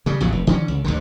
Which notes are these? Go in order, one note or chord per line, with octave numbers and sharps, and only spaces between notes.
C#3 G3
A#1 E2 A2 F#3
F1
D3 E3 C#4
C#2
D2 G2 D3